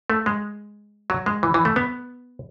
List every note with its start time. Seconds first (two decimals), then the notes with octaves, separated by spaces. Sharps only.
0.10 A3
0.26 G#3
1.10 F#3
1.26 G#3
1.43 E3
1.54 E3
1.65 A3
1.76 B3